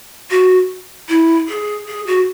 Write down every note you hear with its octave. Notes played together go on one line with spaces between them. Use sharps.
F#4
E4
G#4
G#4
F#4